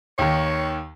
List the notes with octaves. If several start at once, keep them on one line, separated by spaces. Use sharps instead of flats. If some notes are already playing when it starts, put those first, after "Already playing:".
D#2 D#3 C#5